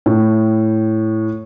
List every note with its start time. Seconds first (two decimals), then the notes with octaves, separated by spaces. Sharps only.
0.06 A2